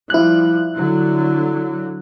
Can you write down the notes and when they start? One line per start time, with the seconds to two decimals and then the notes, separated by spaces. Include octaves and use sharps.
0.10 F3 G3 E4 F#6
0.77 D3 F#3